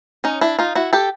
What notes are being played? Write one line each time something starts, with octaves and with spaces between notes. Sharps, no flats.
C#4 D#4
D4 E4
D#4 F4
E4 F#4
G4 A4